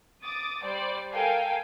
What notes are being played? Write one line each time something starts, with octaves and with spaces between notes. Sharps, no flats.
D6 D#6 A6
G3 C5 D5
A4 A#4 F5 G5 G#5